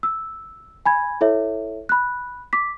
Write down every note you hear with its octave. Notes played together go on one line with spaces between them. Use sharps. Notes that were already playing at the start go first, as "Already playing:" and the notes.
E6
G#5 B5 G#6
E4 A4 C#5 E5
B5 F#6
D6 B6